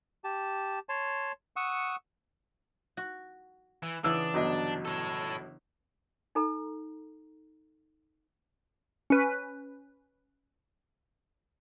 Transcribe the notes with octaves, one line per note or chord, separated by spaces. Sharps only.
G4 A5
C#5 A5 C6
F#5 C#6 D#6 E6
F#4
E3
C#3 E3 B3 D4 E6
G1 F#3 D#5
A4 C#5
D#4 A4 A#5
C#4 B4